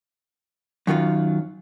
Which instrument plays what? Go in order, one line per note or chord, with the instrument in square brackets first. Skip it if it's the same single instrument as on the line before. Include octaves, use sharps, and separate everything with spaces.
[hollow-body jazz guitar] F#2 D#3 F#3 F4